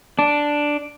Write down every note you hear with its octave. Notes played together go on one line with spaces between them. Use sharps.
D4